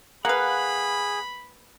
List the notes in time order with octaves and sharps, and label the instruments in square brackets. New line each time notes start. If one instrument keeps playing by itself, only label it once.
[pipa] A#3 B4 [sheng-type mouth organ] G#4 [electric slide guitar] F5 F#5 [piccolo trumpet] B5